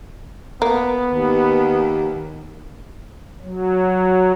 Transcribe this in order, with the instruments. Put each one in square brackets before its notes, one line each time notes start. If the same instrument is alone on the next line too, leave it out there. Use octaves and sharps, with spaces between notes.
[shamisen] A#3 [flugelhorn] B3
[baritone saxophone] D#2
[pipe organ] F#3